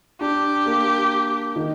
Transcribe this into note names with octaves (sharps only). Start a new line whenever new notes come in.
D4 G4
A#3
D#3